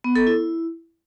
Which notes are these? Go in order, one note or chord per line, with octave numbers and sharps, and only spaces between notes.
B3
A4
E4